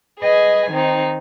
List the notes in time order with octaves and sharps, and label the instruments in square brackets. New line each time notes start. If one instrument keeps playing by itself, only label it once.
[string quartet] G#4 B4 D#5 G#5
D#3 C4 D#4